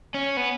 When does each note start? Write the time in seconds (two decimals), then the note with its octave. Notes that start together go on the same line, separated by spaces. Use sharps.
0.14 C#4
0.37 B3